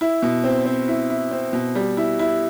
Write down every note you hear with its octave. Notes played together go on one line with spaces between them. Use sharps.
E4
B2
C4
C4
E4
E4
C4
B2
G3
E4
E4